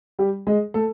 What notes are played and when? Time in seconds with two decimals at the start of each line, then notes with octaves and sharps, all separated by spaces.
0.19 G3 G4
0.47 G#3 G#4
0.74 A3 A4